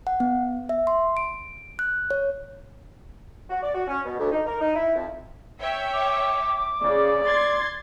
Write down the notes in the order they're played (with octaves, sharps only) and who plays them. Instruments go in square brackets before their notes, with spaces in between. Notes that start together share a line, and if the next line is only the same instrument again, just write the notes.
[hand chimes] F#5
B3
E5
C6
D7
F#6
C#5
[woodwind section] F#4
D5
F#4
C#4
B2
D2
D#4
A#4
D#4
E4
F2
[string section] C#5 E5 G5
[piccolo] D6
[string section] C#3 [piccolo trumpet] D5
[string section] C6 G#6 A6